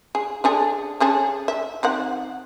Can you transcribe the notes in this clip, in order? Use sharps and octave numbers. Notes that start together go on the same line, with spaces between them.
G#4
D4 G#4 A4
C#4 G#4 A4
E5
D#3 C4 F#5